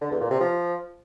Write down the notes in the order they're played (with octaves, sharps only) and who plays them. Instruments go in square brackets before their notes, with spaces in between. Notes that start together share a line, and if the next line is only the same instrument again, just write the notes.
[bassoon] D3
E2
A#2
C3
F3